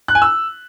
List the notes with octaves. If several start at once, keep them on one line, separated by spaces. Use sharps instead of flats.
F#6
G#5
E6